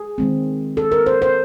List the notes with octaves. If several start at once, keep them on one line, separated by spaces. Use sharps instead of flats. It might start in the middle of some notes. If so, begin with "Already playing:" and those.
Already playing: G#4
D#3 G#3 C4
A4
A#4
C5
C5